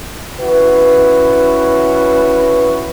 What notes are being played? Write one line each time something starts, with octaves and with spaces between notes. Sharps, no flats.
C#4 E4 F#4 B4